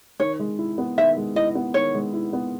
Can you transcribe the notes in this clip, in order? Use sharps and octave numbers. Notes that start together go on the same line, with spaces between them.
D#3 C#5
G#3
E4
B3
D#3 E5
G#3
E4 D#5
B3
D#3 C#5
G#3
E4
B3